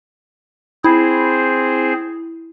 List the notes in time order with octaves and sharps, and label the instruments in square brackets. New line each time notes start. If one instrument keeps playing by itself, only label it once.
[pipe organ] C4 G#4 C5 [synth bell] E4